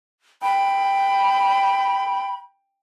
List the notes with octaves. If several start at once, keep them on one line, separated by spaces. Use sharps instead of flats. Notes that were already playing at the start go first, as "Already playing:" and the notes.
G5 B5